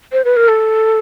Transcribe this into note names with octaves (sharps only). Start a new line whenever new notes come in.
C5
B4
A#4
A4